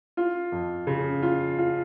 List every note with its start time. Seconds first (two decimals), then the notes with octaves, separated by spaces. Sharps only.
0.17 F4
0.52 F2
0.87 C#3
1.22 F4
1.58 F4